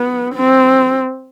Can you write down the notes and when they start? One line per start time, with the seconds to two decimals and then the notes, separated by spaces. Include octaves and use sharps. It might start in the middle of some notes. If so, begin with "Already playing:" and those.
Already playing: B3
0.34 C4